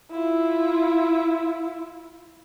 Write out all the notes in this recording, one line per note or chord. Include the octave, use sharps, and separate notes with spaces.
E4 F4